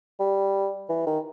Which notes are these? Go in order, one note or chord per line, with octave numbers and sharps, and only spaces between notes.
G3
E3
D#3